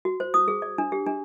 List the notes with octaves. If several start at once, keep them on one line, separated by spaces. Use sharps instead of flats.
F#4
C5
D#6
G#4
D5
D4
G4
D4